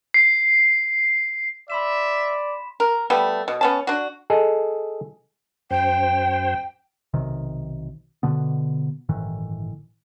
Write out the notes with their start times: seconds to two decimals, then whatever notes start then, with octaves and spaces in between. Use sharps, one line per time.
0.14 C7
1.70 D5 E5 B5 C6 E7
2.27 B6
2.80 A#4
3.10 G3 A3 B3
3.48 B2
3.61 B3 C#4 A5
3.87 D4 F#4
4.30 G#4 A4 D#5
5.71 F#2 C5 G5
7.14 B1 C3 D#3
8.23 B2 D3 B3
9.09 G1 A2 D#3 E3